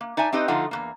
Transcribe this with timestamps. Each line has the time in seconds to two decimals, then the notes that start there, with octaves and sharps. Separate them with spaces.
0.01 A#3
0.17 D#4 D5 E5 G#5 A5
0.32 C4 D#4 G4 B4 D#5
0.48 D3 F3 A3 D#4 F4 F#5
0.71 E2 G#2 A#3